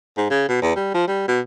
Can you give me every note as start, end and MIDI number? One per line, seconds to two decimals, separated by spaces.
0.17 0.30 44
0.31 0.47 49
0.49 0.57 47
0.62 0.75 40
0.76 0.91 55
0.94 1.07 53
1.08 1.27 55
1.28 1.40 47